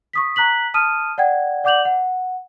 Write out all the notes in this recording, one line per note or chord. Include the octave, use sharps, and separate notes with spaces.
C#6 D#6 B6
A#5 F#6 B6 F#7
A5 D#6 F6 D#7
D5 F#5 G5 G#6
D5 F#5 D6 G6 F7 F#7
F#5